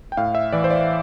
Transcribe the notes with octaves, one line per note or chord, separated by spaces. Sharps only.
G5
A2 F5
E5
E3 D5
C5
D5